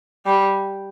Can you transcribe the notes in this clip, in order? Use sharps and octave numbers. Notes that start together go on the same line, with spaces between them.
G3